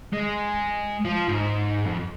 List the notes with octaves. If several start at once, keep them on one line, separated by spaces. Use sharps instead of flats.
G#3
F3
G#2
F2